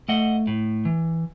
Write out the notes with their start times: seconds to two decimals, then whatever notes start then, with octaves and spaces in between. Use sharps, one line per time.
0.08 A3 D#5 F#5
0.47 A2
0.85 E3